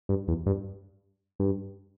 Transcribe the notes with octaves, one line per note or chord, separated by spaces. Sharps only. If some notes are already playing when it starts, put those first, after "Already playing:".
G2
E2
G2
G2